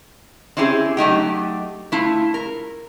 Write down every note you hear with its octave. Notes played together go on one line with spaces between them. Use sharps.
C4 C#4 E4 G4 G#4
F#3 A3 D#4 G4
A3 E4 F4
A#4